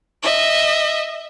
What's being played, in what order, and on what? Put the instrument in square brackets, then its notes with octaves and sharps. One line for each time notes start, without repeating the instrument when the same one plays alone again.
[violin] D#5 E5